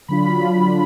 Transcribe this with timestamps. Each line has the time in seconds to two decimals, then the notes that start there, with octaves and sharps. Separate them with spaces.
0.08 D3 F#3 D4 F4 B5